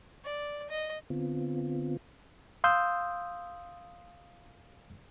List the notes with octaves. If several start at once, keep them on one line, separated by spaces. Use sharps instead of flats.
D5
D#5
D3 B3 C4 F4
F5 C6 D#6 E6 G6